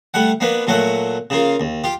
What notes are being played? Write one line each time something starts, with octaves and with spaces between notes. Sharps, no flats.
G3 A3 F#5
A#3 B3 D4 B4
A#2 F#3 A3 A4 F#5
C#3 A#3 F4
D#2
F4 G4